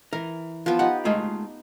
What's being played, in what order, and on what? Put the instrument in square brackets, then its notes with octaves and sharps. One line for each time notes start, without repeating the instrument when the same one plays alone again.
[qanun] E3 [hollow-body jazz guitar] A#4
[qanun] F3 B3
[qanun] D#4 G4 [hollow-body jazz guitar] F#5
[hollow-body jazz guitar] G#3 A3 F4